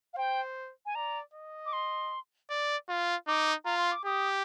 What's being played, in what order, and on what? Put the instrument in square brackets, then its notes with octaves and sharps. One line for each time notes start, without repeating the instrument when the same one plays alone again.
[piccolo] F5
[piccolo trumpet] C5 [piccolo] G5
[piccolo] G#5
[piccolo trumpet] D5 [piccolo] A#5
[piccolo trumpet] D#5
[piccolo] D6
C6
[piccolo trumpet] D5
F4
[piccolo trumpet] D#4 [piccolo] D6
[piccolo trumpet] F4 [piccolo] A#5
[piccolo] C6
D6
[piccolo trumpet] G4 [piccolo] D#6